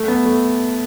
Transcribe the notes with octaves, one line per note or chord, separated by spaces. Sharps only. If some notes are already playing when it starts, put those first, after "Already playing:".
Already playing: A3
B3
A3